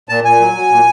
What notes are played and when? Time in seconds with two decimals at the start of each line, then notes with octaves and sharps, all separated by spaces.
0.09 A#2 A5
0.24 A#2 G#5
0.40 F#3
0.54 F#3
0.70 A#2